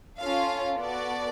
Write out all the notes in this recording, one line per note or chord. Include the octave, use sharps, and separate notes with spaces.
C#4 F4 A4 F5
B3 F#4 A4 D5